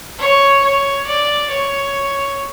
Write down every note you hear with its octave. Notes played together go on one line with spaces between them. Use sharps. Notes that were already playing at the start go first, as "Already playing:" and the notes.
C#5
C#5
D5
C#5